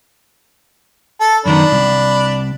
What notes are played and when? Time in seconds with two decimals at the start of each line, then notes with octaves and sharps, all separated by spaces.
1.20 A4
1.46 F#2 D#3 B3 D4 B5
1.72 C2